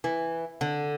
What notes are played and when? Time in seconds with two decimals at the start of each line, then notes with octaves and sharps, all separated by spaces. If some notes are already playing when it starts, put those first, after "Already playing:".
0.04 E3
0.61 D3